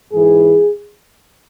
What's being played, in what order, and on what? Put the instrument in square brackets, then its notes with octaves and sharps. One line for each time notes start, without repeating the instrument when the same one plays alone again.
[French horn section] G#2 E3 G#4